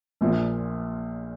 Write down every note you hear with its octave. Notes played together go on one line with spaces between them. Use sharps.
A#1 A#2 F3